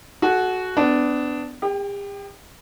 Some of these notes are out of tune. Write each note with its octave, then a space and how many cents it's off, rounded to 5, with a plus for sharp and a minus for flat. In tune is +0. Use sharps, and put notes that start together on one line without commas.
F#4 +0 A4 -40
B3 +30 D4 +0
G4 +45 G5 +0